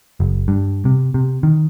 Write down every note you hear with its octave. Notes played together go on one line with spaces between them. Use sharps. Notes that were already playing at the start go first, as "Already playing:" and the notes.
F#1
G2
C3
C3
D#3